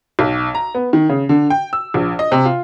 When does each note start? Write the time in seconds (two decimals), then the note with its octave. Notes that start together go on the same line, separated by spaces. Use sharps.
0.19 B1
0.55 A#5
0.75 B3
0.93 D#3
1.09 C#3
1.29 D3
1.50 G5
1.73 E6
1.94 A#1
2.19 D#5
2.32 C3
2.45 F4